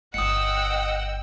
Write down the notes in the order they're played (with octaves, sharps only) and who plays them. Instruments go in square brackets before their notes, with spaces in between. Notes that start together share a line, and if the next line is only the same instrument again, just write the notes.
[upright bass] G1 G3 [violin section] D#5 G5 E6 [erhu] F#5 [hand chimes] D#6 C#7